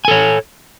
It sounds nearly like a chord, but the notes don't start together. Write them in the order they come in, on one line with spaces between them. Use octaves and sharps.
G#5 A4 C#5